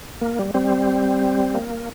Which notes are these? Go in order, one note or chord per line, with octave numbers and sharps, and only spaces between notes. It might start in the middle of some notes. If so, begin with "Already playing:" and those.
A#3
G3
G3 C4
A#3